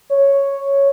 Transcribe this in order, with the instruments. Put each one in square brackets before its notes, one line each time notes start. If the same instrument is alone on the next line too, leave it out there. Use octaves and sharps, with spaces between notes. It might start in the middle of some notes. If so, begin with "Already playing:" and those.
[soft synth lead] C#5